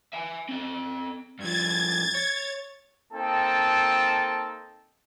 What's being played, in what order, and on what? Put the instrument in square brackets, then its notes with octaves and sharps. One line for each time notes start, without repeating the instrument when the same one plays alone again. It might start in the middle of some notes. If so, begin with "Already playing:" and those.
[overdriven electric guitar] E5 G#5
C4 A4
[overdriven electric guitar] G2 F3 [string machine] G#6 A6
[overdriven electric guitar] C#5
[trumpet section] A#3 C4 D#4 A4 G5 A5